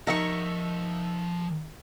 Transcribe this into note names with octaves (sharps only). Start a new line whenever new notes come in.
F3 D#4 A#4 E5 F#5 C#6 C#7